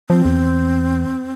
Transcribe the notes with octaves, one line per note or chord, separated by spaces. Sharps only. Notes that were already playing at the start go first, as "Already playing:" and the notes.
F3 C4
E2